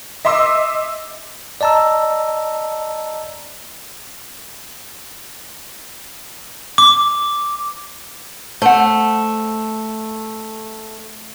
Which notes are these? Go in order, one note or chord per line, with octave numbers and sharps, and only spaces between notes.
D#5 E5 C6 D6 E6
D5 D#5 A5 A#5 E6
D6
A3 C5 F#5